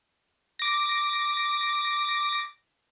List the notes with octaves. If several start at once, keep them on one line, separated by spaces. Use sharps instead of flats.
D6 A#6